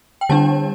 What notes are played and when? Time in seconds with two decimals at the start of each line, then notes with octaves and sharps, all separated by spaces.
0.21 G5
0.29 D3 G3 D4 A5